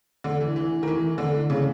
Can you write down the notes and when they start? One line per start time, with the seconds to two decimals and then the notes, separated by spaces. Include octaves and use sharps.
0.24 D3
0.40 E3
0.56 E3
0.83 D#3
0.87 E3
1.18 D3
1.50 C#3